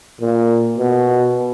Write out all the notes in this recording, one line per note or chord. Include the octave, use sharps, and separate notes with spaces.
A#2
B2